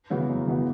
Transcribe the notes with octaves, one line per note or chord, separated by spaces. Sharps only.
C#3 E3 B3 F#4
F#2
C#3 E3 B3 F#4